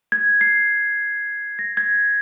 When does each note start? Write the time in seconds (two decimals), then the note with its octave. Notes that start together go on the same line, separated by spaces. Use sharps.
0.12 G#6
0.41 C7
1.59 A#6
1.77 G#6